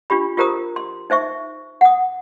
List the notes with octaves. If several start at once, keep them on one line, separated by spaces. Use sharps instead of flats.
D4 F4 G4 B5
F4 G4 A#4 C5 A#5 D#6
C6
D#4 C5 E5 C#6
F#5 D#6